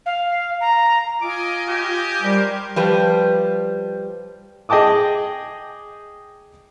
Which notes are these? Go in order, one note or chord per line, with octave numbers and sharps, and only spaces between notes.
F5
A#5
F4 D#5 G#5 D6
G4
G3 A#4 C5
F3 G3 B4
G#4 D#5 G5 A5 D6 D#6